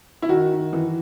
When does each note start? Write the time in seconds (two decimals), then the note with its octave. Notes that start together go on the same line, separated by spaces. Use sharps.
0.22 E4
0.29 D#3 F#4
0.51 D#3
0.73 E3